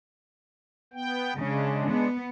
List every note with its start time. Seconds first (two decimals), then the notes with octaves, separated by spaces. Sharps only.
0.93 B3 G5
1.37 C#3 G#3 D4
1.90 B3